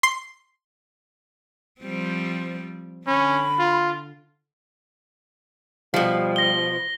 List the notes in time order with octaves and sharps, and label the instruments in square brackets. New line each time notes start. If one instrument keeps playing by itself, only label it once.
[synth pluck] C6 C7
[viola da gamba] F3 G3 C4
[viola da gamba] D3 [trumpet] C#4 [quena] B5
[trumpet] F4
[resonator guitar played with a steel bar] B2 F3 [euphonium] G3
[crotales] A#6 G7